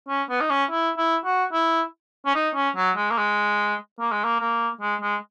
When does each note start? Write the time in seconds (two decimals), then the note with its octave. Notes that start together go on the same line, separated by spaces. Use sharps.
0.08 C#4
0.30 B3
0.41 D#4
0.50 C#4
0.71 E4
0.97 E4
1.25 F#4
1.53 E4
2.26 C#4
2.35 D#4
2.55 C#4
2.76 F#3
2.96 G#3
3.11 A#3
3.17 G#3
4.00 A#3
4.11 G#3
4.24 A#3
4.40 A#3
4.81 G#3
5.02 G#3